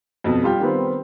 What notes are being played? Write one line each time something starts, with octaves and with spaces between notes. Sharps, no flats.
F2 B2
G3 F4 G4
D#3 G3 B3 C4